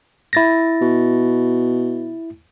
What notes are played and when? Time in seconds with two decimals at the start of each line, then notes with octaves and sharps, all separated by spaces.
0.33 E4 A6 A#6
0.81 B2